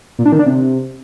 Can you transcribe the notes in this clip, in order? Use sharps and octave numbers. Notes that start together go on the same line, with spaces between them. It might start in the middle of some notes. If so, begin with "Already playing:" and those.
A#2
D4
D#3
D4
C3